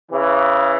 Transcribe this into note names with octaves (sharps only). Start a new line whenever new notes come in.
C#3 E3